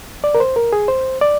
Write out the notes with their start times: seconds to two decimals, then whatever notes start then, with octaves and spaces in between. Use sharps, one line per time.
0.24 D5
0.35 A#4
0.40 C5
0.56 A#4
0.73 G#4
0.88 C5
1.21 D5